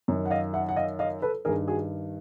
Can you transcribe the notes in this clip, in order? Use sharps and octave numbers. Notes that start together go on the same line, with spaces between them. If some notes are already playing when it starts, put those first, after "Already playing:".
F#2 D#3
F#5
D#5 F5
E5 F#5
F#5
D#5 F5
D#5 F5
A4 B4
G2 D#3 G#4 A#4
F#4 G#4